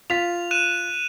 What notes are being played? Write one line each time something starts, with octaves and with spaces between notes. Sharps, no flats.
F4 B6 F7
F#6 D#7 E7